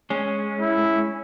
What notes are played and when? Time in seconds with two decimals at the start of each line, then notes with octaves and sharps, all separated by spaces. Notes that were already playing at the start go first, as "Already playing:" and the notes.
0.10 G#3 C#4
0.60 E4